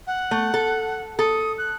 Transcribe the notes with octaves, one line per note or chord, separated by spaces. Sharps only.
F#5
A3
A4
A4 D#6
F#6